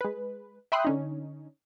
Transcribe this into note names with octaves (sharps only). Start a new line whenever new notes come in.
G#3 B4
E5 G5 B5 C6 D#6 F#6
D3 C#4 D#4